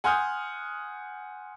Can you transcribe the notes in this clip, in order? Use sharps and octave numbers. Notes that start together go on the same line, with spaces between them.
F#5 G#5 C6 D#6 F6 G6